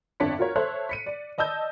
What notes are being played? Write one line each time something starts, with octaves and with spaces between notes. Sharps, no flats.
G1 F2 D4 C#5 B6 C#7
F4 F#4 A#4 C#5
A4 C5 C#5 E5 F#6
B6 C#7 D#7
D5
D5 D#5 A5 E6 G6